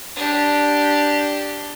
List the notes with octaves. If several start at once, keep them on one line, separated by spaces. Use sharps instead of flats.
D4 G4